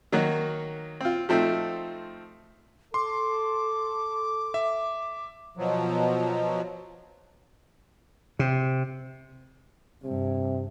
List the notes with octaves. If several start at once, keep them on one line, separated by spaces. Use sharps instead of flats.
D#3 F#3 A#3 D#4 F#4
C4 F4
F3 A3 C4 D#4
A4 C6 D6
E5
B2 F3 F#3
C3
G2 C3